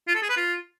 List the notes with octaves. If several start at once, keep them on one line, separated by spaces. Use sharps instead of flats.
F4
A4
G#4
B4
F4